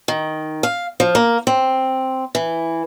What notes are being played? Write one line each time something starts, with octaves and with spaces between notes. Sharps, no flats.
D#3
F5
F3
A#3
C4
E3